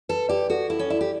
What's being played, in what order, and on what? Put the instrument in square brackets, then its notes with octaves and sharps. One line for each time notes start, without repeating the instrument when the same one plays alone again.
[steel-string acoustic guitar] A4 [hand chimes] B4
[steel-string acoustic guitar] G4 [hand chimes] D5
[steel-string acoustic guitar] F#4 [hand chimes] A4
[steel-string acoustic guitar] E4 [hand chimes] A4
[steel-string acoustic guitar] C#4
[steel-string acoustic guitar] E4 [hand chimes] D5
[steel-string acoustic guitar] G4